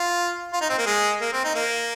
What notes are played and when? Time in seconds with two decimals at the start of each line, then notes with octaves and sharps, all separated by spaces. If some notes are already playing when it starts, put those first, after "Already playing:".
Already playing: F4
0.53 F4
0.61 D#4
0.70 C4
0.78 A#3
0.86 G#3
1.22 A#3
1.33 C4
1.45 D#4
1.55 A#3